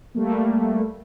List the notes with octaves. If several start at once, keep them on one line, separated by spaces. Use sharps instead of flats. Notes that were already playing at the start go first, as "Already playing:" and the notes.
G3 A3 A#3